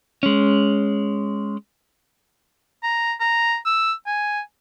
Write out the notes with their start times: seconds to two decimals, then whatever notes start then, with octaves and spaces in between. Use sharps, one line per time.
0.23 G#3 C#4
2.83 A#5
3.20 A#5
3.66 E6
4.06 G#5